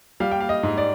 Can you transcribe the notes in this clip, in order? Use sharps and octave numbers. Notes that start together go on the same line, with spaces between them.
G3 F5
G5
F5
D#5
G#2
D5